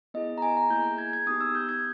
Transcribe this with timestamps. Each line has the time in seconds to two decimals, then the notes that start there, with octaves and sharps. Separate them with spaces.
0.14 B3 E4 G#4 D#5
0.38 A#5
0.42 G#5
0.57 A#5
0.70 A#3 E4 G#4 G6
0.98 G#6
1.13 G#6
1.27 B3 D#4 G4 D#6
1.41 E6
1.55 G6
1.69 G#6